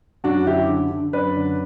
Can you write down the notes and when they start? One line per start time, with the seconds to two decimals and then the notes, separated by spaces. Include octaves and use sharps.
0.24 F#2 D4 F#4
0.46 D3 E4 G4
0.69 D3
0.91 D3
1.13 F#2 B4 D5
1.36 D3